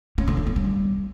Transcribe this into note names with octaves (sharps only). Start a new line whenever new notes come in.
C#4
D3
D4
B3
G3